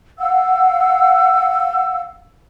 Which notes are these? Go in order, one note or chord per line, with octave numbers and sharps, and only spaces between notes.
F5 F#5 E6